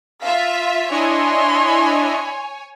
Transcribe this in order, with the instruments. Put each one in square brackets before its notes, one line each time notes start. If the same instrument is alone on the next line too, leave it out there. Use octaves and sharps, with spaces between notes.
[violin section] F4 E5 B6 [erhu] F5
[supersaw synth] D4 E4 D#5 [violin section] C#5 G#5 [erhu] C6